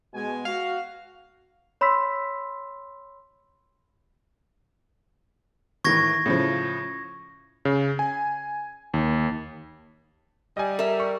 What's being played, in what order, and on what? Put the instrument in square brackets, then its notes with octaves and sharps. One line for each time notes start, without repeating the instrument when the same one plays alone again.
[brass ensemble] B2 G#3 G#5
[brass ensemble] F#4 [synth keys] F5
[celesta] C#5 B5 C6 E6 B6
[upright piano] A2 D#3 E3 [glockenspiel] C#6 G#6 A#6
[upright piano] A2 C#3 F3
[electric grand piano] C#3
G#5
D#2
[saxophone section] G3 [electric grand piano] D#5 G#5
[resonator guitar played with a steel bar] A#4 E5
[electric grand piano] C#6